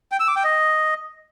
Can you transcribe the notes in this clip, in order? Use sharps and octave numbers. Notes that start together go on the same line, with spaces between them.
G5
E6
D6
G5
D#5